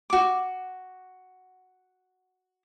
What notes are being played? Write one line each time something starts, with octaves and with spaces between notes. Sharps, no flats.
F#4 D6